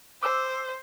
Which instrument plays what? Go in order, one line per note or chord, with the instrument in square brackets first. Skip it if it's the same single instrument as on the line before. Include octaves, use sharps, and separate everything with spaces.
[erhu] C5 [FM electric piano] D6 E6